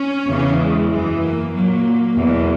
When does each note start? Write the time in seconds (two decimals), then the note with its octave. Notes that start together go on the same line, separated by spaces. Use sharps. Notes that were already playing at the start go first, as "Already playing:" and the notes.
Already playing: C#4
0.26 E2 C#3 E3
0.58 G#3
0.89 F#2 E3
1.22 A#3
1.52 A#2 F#3 A#3
2.15 E2 B2 F#3